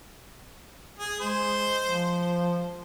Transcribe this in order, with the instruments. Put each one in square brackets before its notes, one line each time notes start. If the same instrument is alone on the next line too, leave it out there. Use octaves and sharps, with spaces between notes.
[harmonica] G#4
[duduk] G#3 [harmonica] C5
[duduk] F3